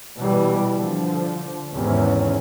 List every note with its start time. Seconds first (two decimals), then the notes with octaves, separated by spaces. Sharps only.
0.17 B2 E3 G3
0.71 D3 F3
1.73 E2 G#2 C3 D#3 C#4